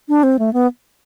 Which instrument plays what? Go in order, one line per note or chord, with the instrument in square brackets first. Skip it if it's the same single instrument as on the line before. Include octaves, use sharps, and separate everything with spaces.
[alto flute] D4
C4
A3
B3